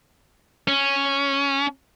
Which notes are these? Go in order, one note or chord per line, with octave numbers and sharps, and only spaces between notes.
C#4